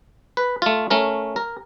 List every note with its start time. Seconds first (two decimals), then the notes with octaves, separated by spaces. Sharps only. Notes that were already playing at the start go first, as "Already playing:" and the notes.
0.37 B4
0.62 A3 F4
0.90 A3 C#4 A#4
1.36 A#4